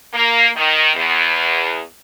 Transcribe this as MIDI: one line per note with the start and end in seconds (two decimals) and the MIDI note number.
0.14 0.48 58
0.56 0.93 51
0.95 1.79 40